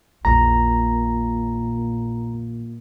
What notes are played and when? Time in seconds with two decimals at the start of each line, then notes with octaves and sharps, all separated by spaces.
0.25 A#1 E2 A#2 A#5